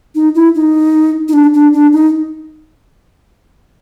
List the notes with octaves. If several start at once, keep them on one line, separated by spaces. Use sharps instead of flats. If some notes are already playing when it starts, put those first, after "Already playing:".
D#4
E4
D#4
D#4
D4
D4
D4
D#4